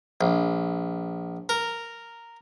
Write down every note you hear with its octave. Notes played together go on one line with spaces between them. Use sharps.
A#1
A#4